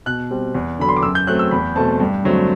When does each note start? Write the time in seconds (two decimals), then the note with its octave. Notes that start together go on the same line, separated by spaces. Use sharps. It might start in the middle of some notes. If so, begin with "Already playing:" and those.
0.06 B2 F#6
0.30 G3 C4
0.54 E2
0.79 D3 F#3 B5
0.88 C6
0.96 D6
1.03 F#2 E6
1.15 G6
1.27 F#3 A3 C4 F#6
1.39 E6
1.51 E2 B5
1.75 B2 A3 C4 A5
2.00 G2
2.24 D3 F#3 A3 C4